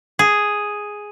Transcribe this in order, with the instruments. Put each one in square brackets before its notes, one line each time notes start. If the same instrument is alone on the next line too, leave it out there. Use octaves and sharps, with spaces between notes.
[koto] G#4